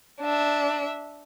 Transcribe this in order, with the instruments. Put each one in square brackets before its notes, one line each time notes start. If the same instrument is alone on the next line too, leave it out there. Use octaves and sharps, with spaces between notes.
[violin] D4 E5